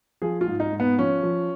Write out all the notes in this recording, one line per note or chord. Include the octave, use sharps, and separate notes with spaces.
F3 G#4
F4
G#2
D#4
G#2
B3
F3 C#4
F3